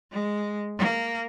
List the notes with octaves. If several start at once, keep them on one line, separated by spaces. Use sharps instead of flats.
G#3
A#3